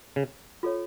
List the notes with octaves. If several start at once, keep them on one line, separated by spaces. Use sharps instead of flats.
C#3
F4 A4 C#5